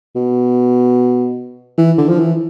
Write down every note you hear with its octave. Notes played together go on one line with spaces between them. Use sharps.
B2
E3
D3
F3
E3